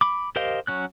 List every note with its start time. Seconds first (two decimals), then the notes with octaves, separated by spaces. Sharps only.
0.01 B5 D6
0.36 G4 A#4 C5 D#5 F5
0.67 F#3 C#4 F#6